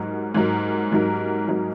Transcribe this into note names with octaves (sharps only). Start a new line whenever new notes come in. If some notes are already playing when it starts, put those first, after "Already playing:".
Already playing: G#2 F#3 D#4 A#4
G#2 F#3 D#4 A#4
G#2 F#3 D#4 A#4
G#2 F#3 D#4 A#4